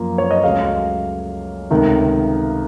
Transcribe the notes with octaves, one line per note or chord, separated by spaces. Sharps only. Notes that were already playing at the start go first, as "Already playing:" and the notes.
Already playing: F#2 F3 A#3
C#5
D#5
C#2 C#3 F#3 A3 F5
C#2 C3 D#3 A3